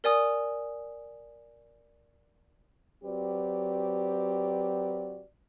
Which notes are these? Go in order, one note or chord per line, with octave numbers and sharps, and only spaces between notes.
A#4 D5 G#5 D#6
F#3 C4 F#4 G4 B4 D5